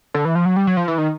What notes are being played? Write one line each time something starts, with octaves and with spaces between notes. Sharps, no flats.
D3
E3
F3
F#3
G3
F#3
F3
E3
D#3